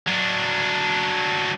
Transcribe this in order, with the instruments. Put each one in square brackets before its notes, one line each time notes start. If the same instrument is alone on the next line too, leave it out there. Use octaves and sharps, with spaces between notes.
[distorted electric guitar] F#3 D4